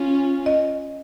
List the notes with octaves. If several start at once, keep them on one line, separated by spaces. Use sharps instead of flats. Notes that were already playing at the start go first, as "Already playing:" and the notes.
Already playing: C#4 F4
D#5